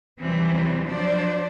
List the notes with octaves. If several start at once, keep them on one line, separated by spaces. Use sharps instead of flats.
D#2 C3 E3 F#3 G3 C4
F3 F#3 D4 C5 D5